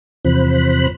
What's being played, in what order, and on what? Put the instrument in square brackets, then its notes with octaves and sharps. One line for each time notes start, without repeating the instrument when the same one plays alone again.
[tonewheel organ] E2 C3 F3 C5 B5 F#6